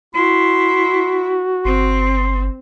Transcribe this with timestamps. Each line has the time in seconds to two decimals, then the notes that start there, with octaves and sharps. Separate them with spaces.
0.15 E4 F#4 C6
1.65 G1 C4 C6